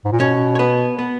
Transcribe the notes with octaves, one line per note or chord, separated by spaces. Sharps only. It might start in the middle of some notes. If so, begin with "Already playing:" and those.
G#2
A#2
B2 C#4 C#5
C#5
B3 B4
B3 B4